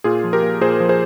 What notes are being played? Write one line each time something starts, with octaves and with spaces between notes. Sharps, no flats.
A#2 F4 G#4
F3
G4 A#4
A#2
A#2 G#4 C5
F3
G#4 C5